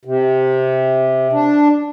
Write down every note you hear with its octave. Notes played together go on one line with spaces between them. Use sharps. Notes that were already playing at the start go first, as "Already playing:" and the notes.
C3
D4